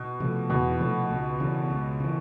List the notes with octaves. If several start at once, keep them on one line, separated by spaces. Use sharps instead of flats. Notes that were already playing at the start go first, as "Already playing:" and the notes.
Already playing: B2
C3 F3 A3
E2 B2
C3 F3 A3
C#2
C#3 E3
C#2
C#3 E3